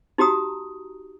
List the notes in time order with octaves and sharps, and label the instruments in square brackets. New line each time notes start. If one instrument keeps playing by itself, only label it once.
[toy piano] D#4 F#4 G4 A#5 D#6